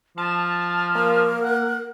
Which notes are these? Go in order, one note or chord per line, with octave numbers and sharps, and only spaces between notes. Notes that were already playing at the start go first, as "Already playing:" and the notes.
F3 A5 F6
A#3 A#4
F#5